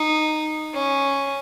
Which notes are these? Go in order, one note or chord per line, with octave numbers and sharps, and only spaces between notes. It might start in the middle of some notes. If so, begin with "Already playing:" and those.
Already playing: D#4
C#4